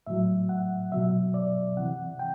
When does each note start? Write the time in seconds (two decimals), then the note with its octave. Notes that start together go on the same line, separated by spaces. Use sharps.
0.07 A2 F#3 E5
0.49 F#5
0.92 B2 F#3 E5
1.34 D5
1.77 C3 E3 F#5
2.19 G5